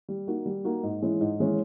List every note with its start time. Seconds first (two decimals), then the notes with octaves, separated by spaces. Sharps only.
0.09 G3
0.27 A#3 D#4 F#4
0.46 G3
0.65 A#3 D#4 F#4
0.83 G#2
1.02 E3 G#3 C#4 E4
1.21 G#2
1.39 E3 G#3 C#4 E4